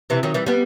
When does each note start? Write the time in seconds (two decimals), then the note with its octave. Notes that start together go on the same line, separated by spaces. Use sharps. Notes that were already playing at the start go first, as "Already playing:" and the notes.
0.10 C3 E3
0.23 D#3 F#3
0.34 E3 G3
0.46 G3 B3